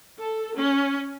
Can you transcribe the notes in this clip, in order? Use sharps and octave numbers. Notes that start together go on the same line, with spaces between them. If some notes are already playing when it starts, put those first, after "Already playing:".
A4
C#4